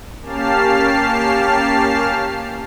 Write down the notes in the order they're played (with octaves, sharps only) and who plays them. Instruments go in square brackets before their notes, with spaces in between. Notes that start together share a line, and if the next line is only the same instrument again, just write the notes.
[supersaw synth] A#3 C#4 G4 A5 F6 C7